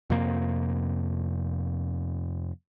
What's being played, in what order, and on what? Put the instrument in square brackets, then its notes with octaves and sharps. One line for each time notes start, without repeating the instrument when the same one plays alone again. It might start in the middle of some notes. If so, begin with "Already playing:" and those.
[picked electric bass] F2 C3 A#3